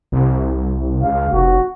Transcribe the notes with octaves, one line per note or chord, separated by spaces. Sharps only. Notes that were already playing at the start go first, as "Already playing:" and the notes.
C2
C#2 F5
F1 F#4